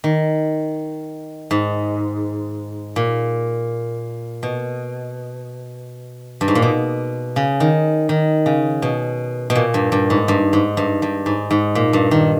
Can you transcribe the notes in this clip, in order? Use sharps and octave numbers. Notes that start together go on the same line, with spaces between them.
D#3
G#2
A#2
B2
G2
G#2
A#2
B2
C#3
D#3
D#3
C#3
B2
B2
A#2
G2
G2
G#2
G2
G#2
G2
G2
G#2
G#2
A#2
G2
D#3